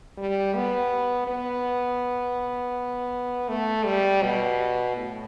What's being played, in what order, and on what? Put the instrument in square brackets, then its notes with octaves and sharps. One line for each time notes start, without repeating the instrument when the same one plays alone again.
[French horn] G3
B3
B3
A3
G3
B2
A2